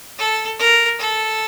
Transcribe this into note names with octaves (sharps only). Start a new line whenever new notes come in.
A4
A#4
A4